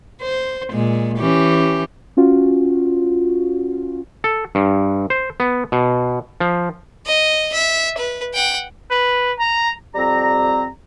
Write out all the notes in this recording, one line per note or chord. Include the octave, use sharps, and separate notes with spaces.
C5
A#2 G#3
E3 C#4 G4
C#4 F4 F#4
A4
G2
C5
B3
B2
F3
D#5
E5
B4
F#5 G5
B4
A#5
F2 G3 C4 A#5